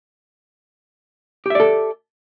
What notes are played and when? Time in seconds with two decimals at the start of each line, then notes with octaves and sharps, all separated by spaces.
1.46 G4
1.50 E5
1.55 D5
1.60 A4